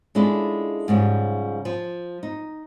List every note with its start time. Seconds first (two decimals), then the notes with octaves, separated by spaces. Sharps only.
0.15 G#3 C#4 D4 E4 F4 A4
0.88 G#2 C#3 F3 G3
1.65 F3
2.23 D#4